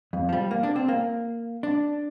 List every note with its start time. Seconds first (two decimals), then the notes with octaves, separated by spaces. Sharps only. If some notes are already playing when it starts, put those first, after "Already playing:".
0.13 F2
0.29 F3
0.33 G3
0.51 A#3
0.63 D4
0.76 C4
0.88 A#3
1.63 D4